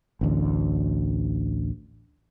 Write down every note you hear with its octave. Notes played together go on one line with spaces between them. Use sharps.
A1 D2